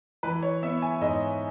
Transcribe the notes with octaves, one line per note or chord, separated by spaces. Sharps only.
E3 B4
C#5
B3 E5
G#5
G#2 D#5